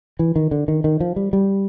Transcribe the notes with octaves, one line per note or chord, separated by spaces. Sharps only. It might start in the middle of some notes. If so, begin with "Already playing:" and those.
E3
D#3
D3
D#3
D#3
F3
G3
G3